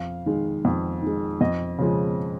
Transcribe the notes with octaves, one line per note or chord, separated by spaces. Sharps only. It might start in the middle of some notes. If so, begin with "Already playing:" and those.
Already playing: F2 F5
D#3 G#3
F2
D#3 G#3
F2 D#5
C#3 F3 G#3